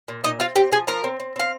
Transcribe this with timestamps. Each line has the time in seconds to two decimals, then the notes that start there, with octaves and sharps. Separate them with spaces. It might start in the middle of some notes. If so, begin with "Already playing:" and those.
0.08 A#2
0.24 A#2 D#4 D#5
0.40 C4 F4 F5
0.56 C4 G4 G5
0.72 F3 G#4 G#5
0.87 F3 A#4 A#5
1.04 C4
1.20 C4
1.36 C4 F5